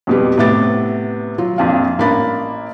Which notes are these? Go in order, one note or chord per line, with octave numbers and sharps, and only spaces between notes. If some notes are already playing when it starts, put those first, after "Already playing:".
F2 B2 G3
A2 C3 B3 E4 D6 A6
F#3 F4
A#1 F2 F5
A1 A#3 D4 B5 A6